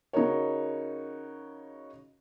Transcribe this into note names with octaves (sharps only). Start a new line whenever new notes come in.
C#3 D#4 F#4 A#4 C#5